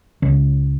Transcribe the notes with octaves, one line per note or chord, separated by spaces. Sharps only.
C#2